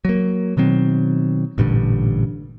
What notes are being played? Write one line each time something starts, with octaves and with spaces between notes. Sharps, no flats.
F#3 A#3
B2 D#3 F#3 C4
A1 G2 A#2 D3